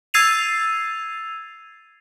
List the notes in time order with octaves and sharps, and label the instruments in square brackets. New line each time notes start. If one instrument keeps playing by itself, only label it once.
[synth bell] E6 G#6 A6 C7 D#7 F7